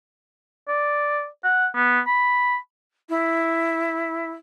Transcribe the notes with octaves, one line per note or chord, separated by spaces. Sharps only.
D5
F#5
B3
B5
E4